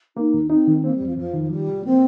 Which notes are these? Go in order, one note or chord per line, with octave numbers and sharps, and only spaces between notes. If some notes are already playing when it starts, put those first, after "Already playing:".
A#3 D#4
D#2
C4 D#4
D#3
A#3 C4
G3
F2
F3
F2 F3
D#3
F3 G3
C2
A#3 C4